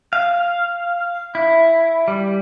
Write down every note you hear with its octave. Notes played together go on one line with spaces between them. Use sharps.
F5
E4
G3